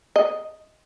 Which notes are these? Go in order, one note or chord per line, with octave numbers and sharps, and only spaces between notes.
D#5